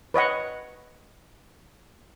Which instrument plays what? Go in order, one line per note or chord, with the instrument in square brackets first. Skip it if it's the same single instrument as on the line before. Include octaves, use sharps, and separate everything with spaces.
[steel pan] B4 C#5 D#5 F#5